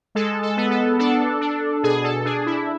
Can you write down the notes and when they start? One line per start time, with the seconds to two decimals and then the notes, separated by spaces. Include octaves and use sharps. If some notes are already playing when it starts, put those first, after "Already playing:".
0.15 G#3 A4
0.43 A4
0.57 B3
0.70 A4
0.99 D4 A4
1.41 D4
1.83 B2 G#4
2.04 A4
2.25 D4 G#4
2.46 E4